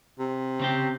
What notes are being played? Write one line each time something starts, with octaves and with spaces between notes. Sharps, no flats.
C3
C#3 C4 G4